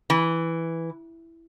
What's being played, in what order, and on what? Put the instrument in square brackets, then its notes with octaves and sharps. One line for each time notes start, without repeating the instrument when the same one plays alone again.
[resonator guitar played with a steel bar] E3